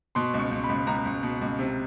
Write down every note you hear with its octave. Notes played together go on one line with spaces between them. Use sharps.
B2 C6
C#2
C#6
C#2
B5
C#2
C#2 A#5
C#2
B2
C#2
C3